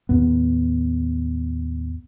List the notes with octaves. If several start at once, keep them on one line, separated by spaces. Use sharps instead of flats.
D#2 A2 B3